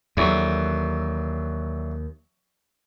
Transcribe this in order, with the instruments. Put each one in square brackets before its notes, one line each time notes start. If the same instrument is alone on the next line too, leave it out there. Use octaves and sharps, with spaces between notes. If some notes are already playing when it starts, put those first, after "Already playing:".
[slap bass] D#2 [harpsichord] D3 E3 F#3